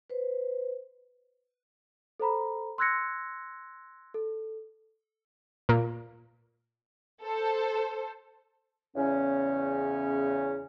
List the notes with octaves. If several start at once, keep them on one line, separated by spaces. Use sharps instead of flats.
B4 C5
A4 C5 A#5 B5
C6 E6 F#6 G#6 A#6 C#7
A4
A#2 A#3
A4 C5
E2 C#3 C#4